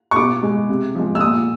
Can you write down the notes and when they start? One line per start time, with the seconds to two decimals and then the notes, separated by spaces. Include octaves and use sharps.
0.11 C#6
0.16 B2 D6
0.43 G#3
0.69 C3
0.95 F3 G#3
1.15 E6
1.20 A#2 D#6